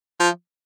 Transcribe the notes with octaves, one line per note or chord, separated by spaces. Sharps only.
F3